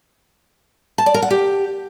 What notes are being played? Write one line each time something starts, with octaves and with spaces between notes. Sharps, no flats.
A5
D5
A#4
F#5
G4